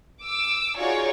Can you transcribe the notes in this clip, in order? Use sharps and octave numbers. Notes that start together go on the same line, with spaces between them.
D6 E6
D#4 F4 F#4 G#4 C#5 D5